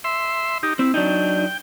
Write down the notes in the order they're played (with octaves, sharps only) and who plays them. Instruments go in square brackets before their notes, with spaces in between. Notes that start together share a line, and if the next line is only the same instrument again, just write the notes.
[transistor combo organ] E5 C6
D#4 G4
[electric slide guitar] C4 [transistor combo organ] E4
[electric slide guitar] F#3 D4 D#4 [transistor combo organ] G5